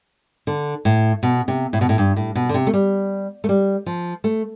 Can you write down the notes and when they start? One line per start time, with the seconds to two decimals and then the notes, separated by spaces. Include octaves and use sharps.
0.47 D3
0.85 A2
1.23 B2
1.48 C3
1.73 A2
1.81 B2
1.89 A2
1.98 G2
2.16 A2
2.35 B2
2.49 D3
2.54 C3
2.67 A3
2.73 G3
3.44 A3
3.49 G3
3.86 F3
4.24 A3